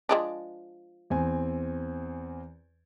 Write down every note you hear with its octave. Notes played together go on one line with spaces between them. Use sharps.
F3 G#3 D4
E2 C4 G#5